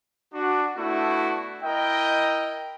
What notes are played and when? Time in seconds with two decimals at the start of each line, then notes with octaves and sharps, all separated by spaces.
0.34 D4 F#4
0.76 A3 B3 D4 E4 F#4
1.63 E4 A#4 D#5 G5